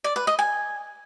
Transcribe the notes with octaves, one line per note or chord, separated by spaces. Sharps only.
D5
B4
D#5
G#5